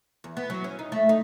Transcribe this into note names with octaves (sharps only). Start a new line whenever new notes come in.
E2
B3
F#3
C#4
D#4
A3
D#4